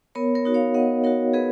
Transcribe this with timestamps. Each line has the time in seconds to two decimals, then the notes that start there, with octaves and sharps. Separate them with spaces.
0.15 B3 A#4 C#5
0.35 A#4 C#5
0.45 D#4 F#4
0.54 C#5 F5
0.74 B3 D#5 F#5
1.04 D#4 F#4 A#4 C#5
1.34 B3 G#4 B4